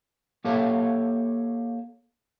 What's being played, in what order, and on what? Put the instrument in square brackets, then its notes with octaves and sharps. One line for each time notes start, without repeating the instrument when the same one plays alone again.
[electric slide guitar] A#3 G4 A4 C#5 E5 F5